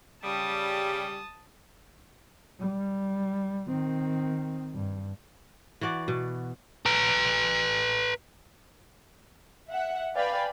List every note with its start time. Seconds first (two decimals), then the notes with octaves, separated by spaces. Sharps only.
0.24 C#3 G3 A5 D#6
2.60 G3
3.68 D#3 C4
4.75 G2
5.81 E3 F#4 D5 F#5
6.08 B2
6.86 B4 A#5
9.70 E5 F#5
10.15 B4 D5 F5 G5 G#5 B5